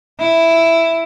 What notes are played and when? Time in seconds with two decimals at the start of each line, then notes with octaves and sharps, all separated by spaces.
0.19 E4